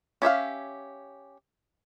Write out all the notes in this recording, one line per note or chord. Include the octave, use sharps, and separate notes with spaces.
C#4 G4 E5 F5